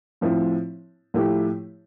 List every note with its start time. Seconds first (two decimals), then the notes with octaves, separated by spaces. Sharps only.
0.21 A2 F3 C4 E4
1.14 A2 F3 A3 E4 G4